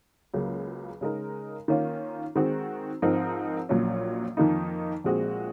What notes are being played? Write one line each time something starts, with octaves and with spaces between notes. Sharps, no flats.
C#2 C#3 F#3 A#3
C#3 G#3 D#4 A#4
D#3 A#3 C#4 F4
D#3 G#3 C4 F#4
G#2 F3 C4 D#4 A#4
A#1 A#2 F#3 C#4
F2 D#3 A#3 D#4
A#1 A#2 G#3 C4 F#4